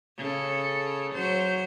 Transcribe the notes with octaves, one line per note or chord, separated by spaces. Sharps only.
C#3 A4
F#3 C5